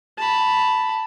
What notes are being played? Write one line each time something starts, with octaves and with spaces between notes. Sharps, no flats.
A5 B5